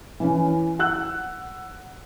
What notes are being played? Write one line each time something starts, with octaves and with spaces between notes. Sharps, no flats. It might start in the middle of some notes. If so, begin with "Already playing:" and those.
E3 C#4
F#5 E6 F#6